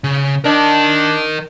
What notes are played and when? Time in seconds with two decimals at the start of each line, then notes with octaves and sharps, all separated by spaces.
0.04 C#3
0.44 D4 A#4 D#5